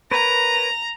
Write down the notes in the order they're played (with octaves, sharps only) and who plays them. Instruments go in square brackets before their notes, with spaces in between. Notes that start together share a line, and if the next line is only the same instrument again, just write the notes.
[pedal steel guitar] A#4 B4 C#5 [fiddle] A#5